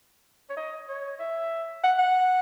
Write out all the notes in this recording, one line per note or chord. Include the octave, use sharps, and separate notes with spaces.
C#5
D#5
C#5
E5
F#5
F#5